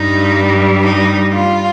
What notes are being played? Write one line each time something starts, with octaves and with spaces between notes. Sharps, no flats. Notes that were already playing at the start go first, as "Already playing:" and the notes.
Already playing: G2 G3 D#4
D#4
F4